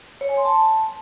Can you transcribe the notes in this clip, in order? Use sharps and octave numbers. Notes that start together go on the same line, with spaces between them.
C#5
G#5
C6
A5